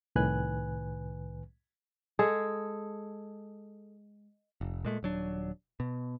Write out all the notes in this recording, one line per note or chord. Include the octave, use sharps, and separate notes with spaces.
C2 A2 D#3 B4 G#5 F#6
G#3 G#4 A4
F1
A#2 G#3 A3
D#1 F#3 D4
B2